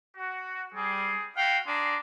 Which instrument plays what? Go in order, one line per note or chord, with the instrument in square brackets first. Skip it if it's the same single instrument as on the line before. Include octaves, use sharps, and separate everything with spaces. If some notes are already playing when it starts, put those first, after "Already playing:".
[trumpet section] F#4
[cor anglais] G3 [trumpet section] C4 G#4
[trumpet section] E4 F#4 F5 [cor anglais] G5
[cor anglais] D4 [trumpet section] G#4 A#5 C6